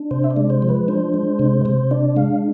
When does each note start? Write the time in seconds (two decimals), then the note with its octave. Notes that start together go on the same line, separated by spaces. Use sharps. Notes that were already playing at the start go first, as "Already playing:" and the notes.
Already playing: D4
0.11 C3 C5
0.24 E5
0.31 D5
0.36 G#3
0.50 C5
0.62 F3
0.69 B4
0.88 D4 C5
1.14 G#3
1.39 C3
1.65 C3 C5
1.91 D4 D5
2.16 G#3 F5